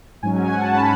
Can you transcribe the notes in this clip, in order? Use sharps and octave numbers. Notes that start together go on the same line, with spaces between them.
G#2 F#3 C#4 G#5
G#5
F#5
A5
F#3 C#4 B5